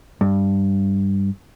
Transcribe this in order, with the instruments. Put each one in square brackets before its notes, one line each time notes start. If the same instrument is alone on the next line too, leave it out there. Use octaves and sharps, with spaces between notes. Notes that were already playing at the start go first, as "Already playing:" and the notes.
[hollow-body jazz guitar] G2